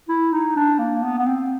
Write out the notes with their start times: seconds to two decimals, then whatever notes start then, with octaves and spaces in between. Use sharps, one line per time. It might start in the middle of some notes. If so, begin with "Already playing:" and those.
0.09 E4
0.32 D#4
0.56 D4
0.79 A#3
1.03 B3
1.18 B3
1.26 C4